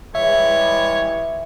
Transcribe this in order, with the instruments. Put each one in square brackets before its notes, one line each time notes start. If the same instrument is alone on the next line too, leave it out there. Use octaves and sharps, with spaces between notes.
[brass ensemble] E3 G3 G#3 [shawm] C#5 [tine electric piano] E5